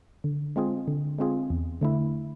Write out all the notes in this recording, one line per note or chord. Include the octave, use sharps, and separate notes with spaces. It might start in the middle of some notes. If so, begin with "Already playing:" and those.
D3
G#3 C4 F4 G#4
D3
G#3 C4 F4 G#4
E2
D3 A3 E4